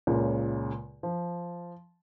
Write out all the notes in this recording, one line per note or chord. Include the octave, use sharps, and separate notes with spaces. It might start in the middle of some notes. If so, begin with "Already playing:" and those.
C#2 A#2 C#3
F3